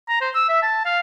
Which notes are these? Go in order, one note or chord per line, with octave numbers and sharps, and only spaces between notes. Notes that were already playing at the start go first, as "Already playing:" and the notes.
A#5
C5
E6
E5
A5
F5